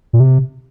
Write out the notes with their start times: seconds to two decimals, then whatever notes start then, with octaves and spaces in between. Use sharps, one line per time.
0.13 A#2
0.20 C3